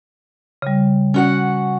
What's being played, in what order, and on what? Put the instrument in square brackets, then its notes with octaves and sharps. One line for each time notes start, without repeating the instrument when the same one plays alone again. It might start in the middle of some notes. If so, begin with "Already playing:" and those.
[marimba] C#3 G3
[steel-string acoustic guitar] C#4 F#4 F#5